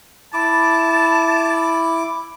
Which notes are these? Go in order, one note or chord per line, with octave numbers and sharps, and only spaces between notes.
E4 A5 D6